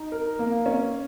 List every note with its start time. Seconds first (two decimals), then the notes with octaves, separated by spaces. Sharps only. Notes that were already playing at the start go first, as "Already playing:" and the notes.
Already playing: D#4
0.12 A#4
0.39 A#3
0.66 C#4